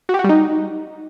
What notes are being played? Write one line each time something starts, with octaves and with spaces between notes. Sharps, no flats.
F#4
G4
F#4
G3
D#4